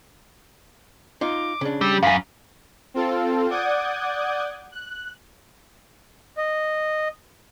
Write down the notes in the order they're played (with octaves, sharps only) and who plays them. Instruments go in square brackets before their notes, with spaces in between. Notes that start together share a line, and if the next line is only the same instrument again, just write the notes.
[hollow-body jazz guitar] D#4 F4 [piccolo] D6
[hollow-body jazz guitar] C#3 D4
[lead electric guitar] G3 [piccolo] E6
[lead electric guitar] F#2 [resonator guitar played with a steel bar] F5 G#5 [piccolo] B5
[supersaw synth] C4 F4 A4
D5 F#5 D6 D#6 G6 G#6
F#6
[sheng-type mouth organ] D#5